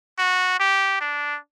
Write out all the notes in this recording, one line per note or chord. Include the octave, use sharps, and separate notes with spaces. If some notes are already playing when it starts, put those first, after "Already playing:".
F#4
G4
D4